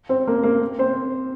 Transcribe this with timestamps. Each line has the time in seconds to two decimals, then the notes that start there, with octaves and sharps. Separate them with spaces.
0.09 C4 C5
0.27 A#3 A#4
0.44 A#3 A#4
0.79 C4 C5